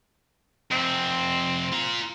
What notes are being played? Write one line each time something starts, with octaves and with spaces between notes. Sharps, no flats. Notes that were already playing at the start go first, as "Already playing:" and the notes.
F2 C3 C4
F4 A#5